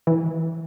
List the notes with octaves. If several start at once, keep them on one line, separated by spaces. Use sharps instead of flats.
E3